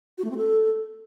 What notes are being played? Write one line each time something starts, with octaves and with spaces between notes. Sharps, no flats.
F#4
A3
C4
A4